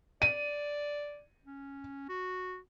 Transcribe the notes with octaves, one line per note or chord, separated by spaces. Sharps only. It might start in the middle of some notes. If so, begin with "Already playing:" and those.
D5 D#7
C#4
F#4